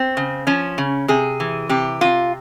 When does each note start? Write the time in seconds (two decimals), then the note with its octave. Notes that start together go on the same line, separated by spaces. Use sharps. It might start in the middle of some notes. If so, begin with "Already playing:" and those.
Already playing: C4
0.17 C#3
0.47 F3 C#4
0.78 C#3
1.08 C3 G#4
1.40 E3
1.69 C3 G4
2.01 C3 F4